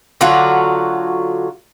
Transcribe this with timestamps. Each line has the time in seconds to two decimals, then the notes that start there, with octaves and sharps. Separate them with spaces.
0.21 D3 F#3 F4 F#4